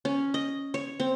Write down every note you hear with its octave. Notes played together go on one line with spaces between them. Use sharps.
C#4
D#5
C#5
C4